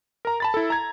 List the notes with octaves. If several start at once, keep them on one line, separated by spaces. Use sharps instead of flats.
A#4 A#5
A5 B5 A6
E4 A4
A#5 G#6